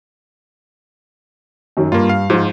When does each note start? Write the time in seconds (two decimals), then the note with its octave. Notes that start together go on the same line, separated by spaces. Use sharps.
1.77 F#2 D#3 F#3
1.92 G2 A#3 F4
2.09 F5
2.30 G#2 F3 F4